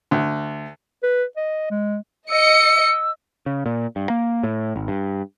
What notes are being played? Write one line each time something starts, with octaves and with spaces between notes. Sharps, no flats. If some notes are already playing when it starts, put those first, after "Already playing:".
D2
B4
D#5
G#3
D#5 E6 C#7
C#3
A#2
G2
A#3
A2
G#1
G2